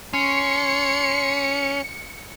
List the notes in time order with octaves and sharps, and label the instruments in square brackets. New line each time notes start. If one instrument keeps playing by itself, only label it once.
[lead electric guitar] C#4 [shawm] C6 [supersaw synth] C#7